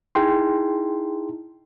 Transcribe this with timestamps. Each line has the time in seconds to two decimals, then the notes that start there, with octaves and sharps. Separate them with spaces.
0.15 D#4 E4 G#4 G5 C6